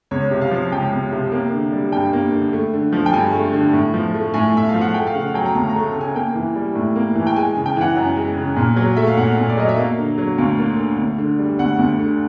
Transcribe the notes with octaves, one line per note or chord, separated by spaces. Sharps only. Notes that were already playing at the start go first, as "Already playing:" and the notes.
C#2 C#5
C3
F5
F3
C#2 G5
C#2
C3
A#3
D3
G3
G2 G5
A#3
D3
A3
D3
F3
G5
G2 G#5
A3
D3
A2
F3
A3
A2 G#5
A2 E5
F5
F3
F#5
A3 G5
F5
C#3 F#5
F#3 G5
A#5
D2 A5
A#5
A3
A5
C#3
G#5
A#3 G5
E3
G3
A2
A#3
E3
G5
G#3 G#5
C#3
G5
E3 F#5
F#2
G#3
C#3
A#2
F#3
A3 E5
F5
A#2 F#5
A#2
D5
F#3 D#5
E5
A#3 F5
D3
F#3
D2 F5
A#3
D3
D2
D3
G3
D2 F#5
D2
D3